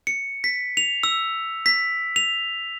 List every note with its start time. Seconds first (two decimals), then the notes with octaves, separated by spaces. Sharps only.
0.07 C#7
0.44 B6
0.77 F7
1.03 E6
1.66 B6
2.16 F7